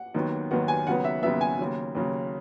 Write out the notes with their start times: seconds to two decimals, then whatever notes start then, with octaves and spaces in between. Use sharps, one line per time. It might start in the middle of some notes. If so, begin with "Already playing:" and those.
Already playing: F#5
0.14 D#2 D#3 F#3 B3
0.51 D#2 D#3 F#3 B3 F#5
0.68 G#5
0.87 D#2 C#3 F#3 B3 F#5
1.04 E5
1.22 D#2 C#3 F#3 B3 E5
1.41 G#5
1.59 D#2 C#3 F#3
1.95 D#2 C#3 F#3